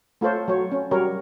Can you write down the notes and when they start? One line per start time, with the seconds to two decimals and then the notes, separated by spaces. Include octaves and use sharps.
0.21 A3 F4 A4 C5 C#5
0.48 F#3 C#5
0.72 C#4
0.91 F#3 G3 A#4 C#5